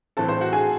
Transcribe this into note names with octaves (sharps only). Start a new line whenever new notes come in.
A2 E3 C4 A4 A5
C5 C6
F#4 F#5
G#4 G#5